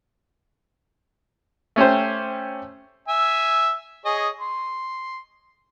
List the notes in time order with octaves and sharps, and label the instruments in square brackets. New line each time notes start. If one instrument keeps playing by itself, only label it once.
[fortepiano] A3 C#4 G4 C5
[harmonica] E5 G#5
G#4 C#5 D#5
C6